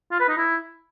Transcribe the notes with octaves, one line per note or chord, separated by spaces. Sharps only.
F4
B4
D#4
E4